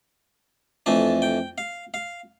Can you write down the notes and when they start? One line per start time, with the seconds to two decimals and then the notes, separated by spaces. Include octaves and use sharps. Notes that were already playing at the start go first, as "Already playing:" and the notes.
0.86 F2 E3 A3 D4 A5
1.22 G5
1.58 F5
1.94 F5